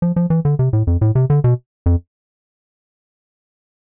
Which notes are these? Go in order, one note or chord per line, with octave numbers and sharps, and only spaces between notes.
F3
F3
E3
D3
C3
A2
F2
A2
C3
D3
B2
F2